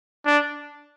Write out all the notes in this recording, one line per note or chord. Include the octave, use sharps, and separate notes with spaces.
D4